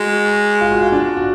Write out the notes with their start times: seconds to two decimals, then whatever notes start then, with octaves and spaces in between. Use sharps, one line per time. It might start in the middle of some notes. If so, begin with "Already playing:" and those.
Already playing: G#3 F#4
0.61 F4
0.71 F#4
0.82 F4
0.92 D4
1.17 F#4